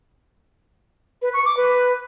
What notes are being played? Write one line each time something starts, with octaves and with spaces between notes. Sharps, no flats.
B4
C#6
D6
B4